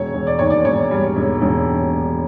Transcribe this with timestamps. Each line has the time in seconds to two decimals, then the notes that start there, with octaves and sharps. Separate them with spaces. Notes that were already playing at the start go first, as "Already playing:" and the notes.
Already playing: E1 C#5
0.14 E1
0.27 D5
0.39 D#2 C#5
0.50 D5
0.65 E1 C#5
0.91 G3
1.16 E1
1.42 E1